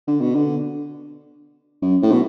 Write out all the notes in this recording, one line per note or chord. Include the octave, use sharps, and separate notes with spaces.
D3
B2
D3
F#2
A2
B2